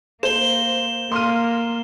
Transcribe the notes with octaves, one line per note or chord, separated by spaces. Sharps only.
A#3 C5 E7 G7
A#3 C6 F6 D#7